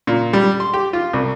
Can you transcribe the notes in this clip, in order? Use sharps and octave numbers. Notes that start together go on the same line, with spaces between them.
A#2
G3
C6
G4
F4
C2